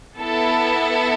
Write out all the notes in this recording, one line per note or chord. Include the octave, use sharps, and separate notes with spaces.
B3 E4 A4